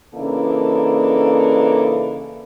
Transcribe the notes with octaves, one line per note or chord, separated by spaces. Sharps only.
C#3 E3 A#3 D4 D#4 A4